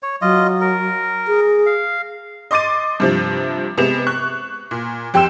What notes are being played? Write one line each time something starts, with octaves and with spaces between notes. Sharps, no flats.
C#5
F#3 F4 D#5
A#4
G#4
F5
D#5 C6 D6 A6 D#7
G2 C3 F3
C3 G#3 B3 E7 F7
C#6 F#6
A#2
F2 G4 G5 C6 E6 E7